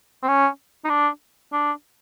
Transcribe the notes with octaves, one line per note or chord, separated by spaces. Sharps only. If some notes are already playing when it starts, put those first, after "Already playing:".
C4
C#4
D#4
D4
D4